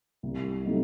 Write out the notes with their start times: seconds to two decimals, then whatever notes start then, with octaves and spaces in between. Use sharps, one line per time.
0.23 C2
0.65 C3 F#3 A3 D#4